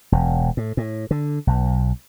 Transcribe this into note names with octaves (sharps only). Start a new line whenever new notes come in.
E1
A2
A2
D3
B1